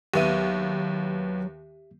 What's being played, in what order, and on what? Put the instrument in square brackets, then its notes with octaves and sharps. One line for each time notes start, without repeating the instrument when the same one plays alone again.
[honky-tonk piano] D#2 B3 D#7 [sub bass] F#3 [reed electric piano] G4 E5